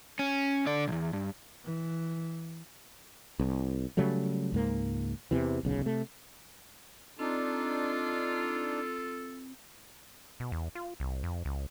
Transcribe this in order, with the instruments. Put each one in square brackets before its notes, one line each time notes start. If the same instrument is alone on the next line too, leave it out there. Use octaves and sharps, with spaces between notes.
[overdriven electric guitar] C#4
D3 D5
B1 E2
G2
[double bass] E3
[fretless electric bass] C2
C#3 F#3 G3 A3
C#2 G#2 A#3
E2 C3 E3
D1 B1 C#3
C3 A3
[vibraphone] C4 [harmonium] D4 D#4 [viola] F4 [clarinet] A4
[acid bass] B2
E2
F4
C2
F2
C#2